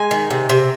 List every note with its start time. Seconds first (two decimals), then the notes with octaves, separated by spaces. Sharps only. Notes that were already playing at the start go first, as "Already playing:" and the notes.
Already playing: G#3 G#5
0.11 D#3
0.31 C3
0.49 C3